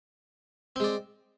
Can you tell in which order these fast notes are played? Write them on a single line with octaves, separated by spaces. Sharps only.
C4 G#3 D5